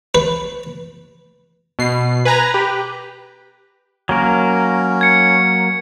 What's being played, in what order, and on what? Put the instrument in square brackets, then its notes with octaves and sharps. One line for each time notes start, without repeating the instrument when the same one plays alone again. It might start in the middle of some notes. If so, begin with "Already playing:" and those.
[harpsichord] B4
[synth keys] B2 C7
B4 G#5 A#5
G4 B4
[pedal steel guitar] F#3 A#3 A#4 [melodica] C#4
[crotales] G#6 C#7